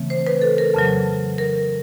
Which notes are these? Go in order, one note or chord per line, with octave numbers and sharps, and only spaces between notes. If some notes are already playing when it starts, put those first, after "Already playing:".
Already playing: C#3 E3 A3 C4
C5
B4
A4
A#4
F2 C#3 F#3
A#4